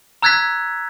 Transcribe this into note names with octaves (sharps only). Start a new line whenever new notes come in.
A#5 E6 F#6 G#6 A6 B6